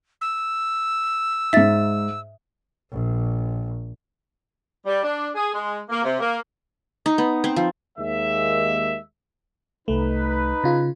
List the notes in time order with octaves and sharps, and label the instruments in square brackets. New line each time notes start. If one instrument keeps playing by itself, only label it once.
[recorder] E6
[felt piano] G#2 D#4 [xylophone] E5 A6
[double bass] A#1
[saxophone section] G3
D4
G#4
G#3
A#3
C3
A#3
[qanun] D#4
B3
C4
F3
[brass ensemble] D#2 G#3 A#3 E5
[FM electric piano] C2 A3 [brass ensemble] D#4 B4
[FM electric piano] C#3 F4